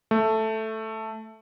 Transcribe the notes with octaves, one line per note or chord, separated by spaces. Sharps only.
A3